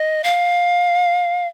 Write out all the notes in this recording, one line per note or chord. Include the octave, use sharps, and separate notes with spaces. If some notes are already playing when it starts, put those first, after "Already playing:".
Already playing: D#5
F5